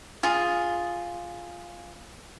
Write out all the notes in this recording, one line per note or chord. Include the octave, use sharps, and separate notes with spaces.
F4 G#4